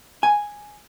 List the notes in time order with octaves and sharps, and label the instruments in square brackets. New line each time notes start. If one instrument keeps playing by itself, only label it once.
[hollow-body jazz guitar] G#5